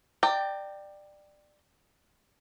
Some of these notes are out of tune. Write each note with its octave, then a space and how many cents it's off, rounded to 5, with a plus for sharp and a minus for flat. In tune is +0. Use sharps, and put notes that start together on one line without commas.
D5 +20 G5 +0 A#5 -30